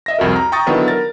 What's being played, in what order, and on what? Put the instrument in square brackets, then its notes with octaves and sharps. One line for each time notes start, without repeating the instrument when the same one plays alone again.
[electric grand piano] D#5 E5 A#6
C2 F2 F#4 A#4
A#5 F6
G5 A#5 C#6 D#6 A6
D3 D#3 F#3 B3 E4
A#4 A6